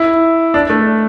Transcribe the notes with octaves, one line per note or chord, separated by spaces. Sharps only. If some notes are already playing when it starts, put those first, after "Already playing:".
Already playing: E4
D4
A3